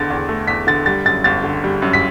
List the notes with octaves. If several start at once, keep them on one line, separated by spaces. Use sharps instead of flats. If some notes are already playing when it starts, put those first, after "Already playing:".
Already playing: E2 D3 A6
E2
A3
E2 B6
D3 A6
G3 A6
F#2 A6
G1 A6
D3
G3
F#2
B6